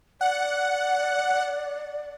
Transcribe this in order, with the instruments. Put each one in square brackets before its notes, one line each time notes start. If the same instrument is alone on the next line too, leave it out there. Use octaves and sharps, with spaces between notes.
[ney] D5 [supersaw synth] F#5